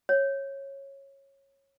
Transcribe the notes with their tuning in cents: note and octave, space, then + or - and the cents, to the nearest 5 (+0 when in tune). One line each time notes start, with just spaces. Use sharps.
C#5 -15